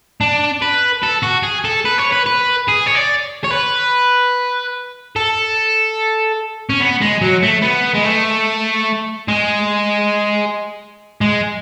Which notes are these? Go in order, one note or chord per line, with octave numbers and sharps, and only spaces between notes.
D4
B4
A4
F#4
G#4
A4
B4
C#5
B4
B4
G#4
C#5
D5
C#5
B4
A4
C#4
B3
G#3
F#3
A3
B3
G#3
A3
G#3
G#3